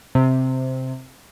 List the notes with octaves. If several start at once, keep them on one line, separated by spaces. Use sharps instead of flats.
C3